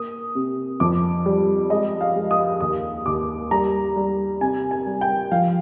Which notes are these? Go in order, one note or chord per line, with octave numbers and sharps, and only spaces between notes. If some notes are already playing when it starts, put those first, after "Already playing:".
Already playing: A#3 D#6
C3
F2 D6
G3
G#3 D#5
F5
G#3
D#6
D#2 D#6
D#2 D6
G3 A#5
G3
C3 G#5
G#5
G3
G5
F3 F5